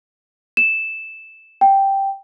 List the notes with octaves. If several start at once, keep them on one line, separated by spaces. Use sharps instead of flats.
E7
G5